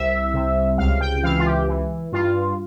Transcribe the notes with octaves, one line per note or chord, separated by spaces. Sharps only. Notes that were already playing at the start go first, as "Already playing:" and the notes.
Already playing: C2 E5
C3
C#2 F5
G5
E3 F5
F4
G4
E3
G2 F4